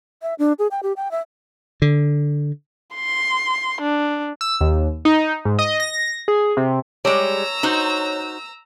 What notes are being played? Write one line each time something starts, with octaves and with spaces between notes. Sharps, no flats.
E5
D4
G#4
G5
G4
G5
E5
D3
C6
D4
E6
D#2
D#4
G#2
D#5
A#6
G#4
C3
G3 G#3 C#5 A#5 E6
D#4 F#4 C5